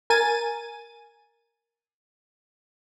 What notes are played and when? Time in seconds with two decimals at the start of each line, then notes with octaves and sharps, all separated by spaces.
0.10 A#4 G#5 A6 D#7